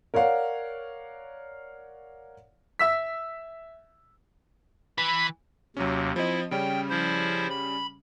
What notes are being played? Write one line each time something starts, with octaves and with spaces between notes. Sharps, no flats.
A#4 C#5 D5 F5 F#5
E5 E6 B6
E3 B5
D#2 C3 F#3 C#4
F3 C4 E4 D#5
C#3 G3 C#4 G5
F3 E4 C5
B5